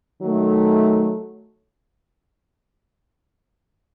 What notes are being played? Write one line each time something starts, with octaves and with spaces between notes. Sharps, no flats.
D#3 F#3 A3